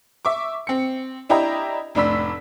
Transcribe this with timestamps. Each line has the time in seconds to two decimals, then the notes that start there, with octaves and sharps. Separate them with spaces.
0.25 E5 C#6 D6
0.67 C4 C#7
1.29 D4 E4 G4 D#5 G5 A#5
1.95 F1 A2 D4 B5 E6 B6